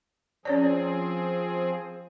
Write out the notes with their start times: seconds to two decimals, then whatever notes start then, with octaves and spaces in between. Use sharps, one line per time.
0.45 F3 C4 C#4 G#4 C#5 D5